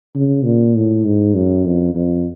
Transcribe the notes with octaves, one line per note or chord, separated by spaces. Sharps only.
C#3
A#2
A2
G#2
F#2
F2
F2